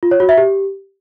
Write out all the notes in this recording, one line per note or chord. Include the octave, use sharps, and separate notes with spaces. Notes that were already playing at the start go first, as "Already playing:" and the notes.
F4
C#5
F#4
E5
G4